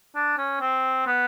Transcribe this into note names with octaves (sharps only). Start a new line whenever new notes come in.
D4
C#4
C4
B3